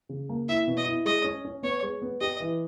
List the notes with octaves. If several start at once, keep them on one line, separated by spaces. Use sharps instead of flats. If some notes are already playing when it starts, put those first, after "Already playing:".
C#3
A#3
E4 E5
B2
D#5
E4
G#3 D#5
C#4
C#4
B3 C#5
G#3
B3
G4 D#5
E3